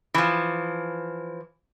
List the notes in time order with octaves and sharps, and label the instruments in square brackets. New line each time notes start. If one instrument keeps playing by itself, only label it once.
[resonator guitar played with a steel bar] E3 F3